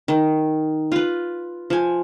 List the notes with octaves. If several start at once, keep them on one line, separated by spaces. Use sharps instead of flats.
D#3
F4 B4
F3 G#5